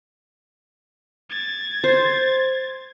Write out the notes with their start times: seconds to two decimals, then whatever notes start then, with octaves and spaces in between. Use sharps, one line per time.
1.30 G#6 A6
1.84 C5